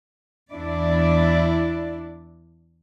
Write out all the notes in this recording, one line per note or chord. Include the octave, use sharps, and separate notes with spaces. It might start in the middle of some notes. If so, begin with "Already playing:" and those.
E2 D4 E4 D5